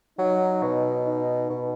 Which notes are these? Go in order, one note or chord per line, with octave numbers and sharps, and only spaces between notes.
F#3 D#4
B2
D#4
B2